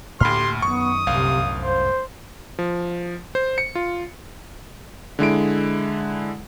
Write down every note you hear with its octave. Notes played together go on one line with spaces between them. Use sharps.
D2 A2 A3 A#3 G4 B5 C6 F6
F#2 D#3 B3 C#6 D#6
G1 C2 F#2 A2 C3 F5
C5
F3
C5
C#7
F4
D3 G#3 E4 D7